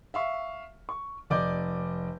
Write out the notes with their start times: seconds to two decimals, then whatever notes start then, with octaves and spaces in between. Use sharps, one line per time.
0.14 E5 F5 C#6
0.89 C#6
1.30 F1 D5 D#5 D6 G6